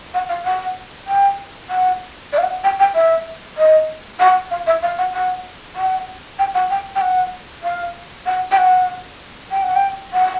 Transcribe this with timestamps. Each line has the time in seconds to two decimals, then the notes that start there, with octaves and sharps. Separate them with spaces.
0.14 F#5
0.29 F5
0.45 F#5
1.07 G5
1.70 F#5
2.32 D5
2.38 F5
2.43 F#5
2.63 G5
2.79 G5
2.95 E5
3.57 D#5
4.19 F#5
4.51 F5
4.66 E5
4.82 F5
4.98 F#5
5.14 F#5
5.76 F#5
6.38 G5
6.54 F#5
6.70 G5
6.95 G5
7.01 F#5
7.63 F5
8.26 F#5
8.51 G5
8.57 F#5
9.51 G5
9.63 F#5
9.75 G5
10.13 F#5